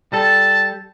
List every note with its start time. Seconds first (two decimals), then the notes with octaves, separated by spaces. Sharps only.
0.13 G3 A4 A5